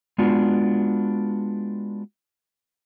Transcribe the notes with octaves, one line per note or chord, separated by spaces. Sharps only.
G#3 B3 D4 F4 F#4